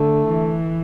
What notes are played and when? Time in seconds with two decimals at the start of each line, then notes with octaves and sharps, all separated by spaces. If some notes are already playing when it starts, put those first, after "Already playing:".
Already playing: D3 A3
0.28 E3